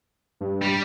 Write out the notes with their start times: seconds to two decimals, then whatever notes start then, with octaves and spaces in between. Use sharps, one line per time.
0.41 G2
0.62 G3 G4